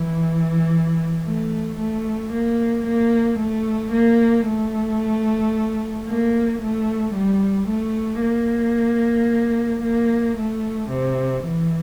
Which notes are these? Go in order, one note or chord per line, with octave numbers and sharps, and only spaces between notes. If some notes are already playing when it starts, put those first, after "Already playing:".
Already playing: E3
A3
A3
A#3
A#3
A3
A#3
A3
A#3
A3
G3
A3
A#3
A#3
A3
C3
E3